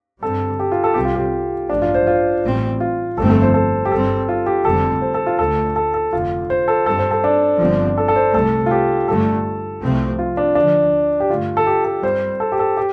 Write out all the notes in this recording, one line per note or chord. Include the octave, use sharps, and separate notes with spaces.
G2 D3 G3 C4 A4
G4
F4
A4
C2 C3 G3 C4 G4
F4
G4
A1 G2 F3 D4
F4
C5
F4
A1 A2 G3 C4
F4
G1 F2 F3 A3 C4 A4
A4
C5
A4
G4
G1 G2 G3 C4 A4
F4
G4
F1 F2 D3 G3 C4 A4
C5
A4
F4
D2 D3 A3 A4
A4
A4
F1 F2 D3 F4
C5
A4
G2 G3 C4 A4
C5
A4
D4
G1 G2 D3 F3 C4
A4
A4
C5
C2 C3 A3 A4
F4
G4
G1 G2 D3 A3 A4
C2 C3 F3 A3 C4
F4
D4
D2 D3 F3 D4
G4
G2 D3 A3 F4
A4
G4
A4
G2 G3 C4 C5
A4
G4
A4
G4